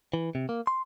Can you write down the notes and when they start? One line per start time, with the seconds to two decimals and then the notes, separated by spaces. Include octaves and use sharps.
0.14 E3
0.35 C3
0.49 A#3
0.67 C6